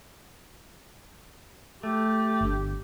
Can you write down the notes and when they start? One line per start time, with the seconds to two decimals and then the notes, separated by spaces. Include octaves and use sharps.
1.83 A3 G4
2.41 G1 D4